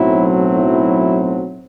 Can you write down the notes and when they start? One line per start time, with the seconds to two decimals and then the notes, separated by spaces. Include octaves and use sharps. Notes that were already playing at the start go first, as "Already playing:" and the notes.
Already playing: B1 A2 F#3 C4 E4
0.55 E4